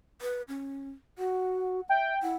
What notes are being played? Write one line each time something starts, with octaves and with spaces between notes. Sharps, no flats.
B4
C#4
F#4 F#5
E5 G5
E4 F#5